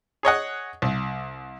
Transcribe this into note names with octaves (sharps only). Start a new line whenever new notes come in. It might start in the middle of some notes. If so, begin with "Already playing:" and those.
G#4 C#5 D#5 F#5
C2